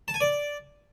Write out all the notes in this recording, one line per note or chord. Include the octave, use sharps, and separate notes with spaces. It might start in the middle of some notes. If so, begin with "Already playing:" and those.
A5
G#5
D5